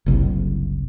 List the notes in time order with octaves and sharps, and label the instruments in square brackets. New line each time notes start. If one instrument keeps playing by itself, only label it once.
[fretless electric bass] F#1 C2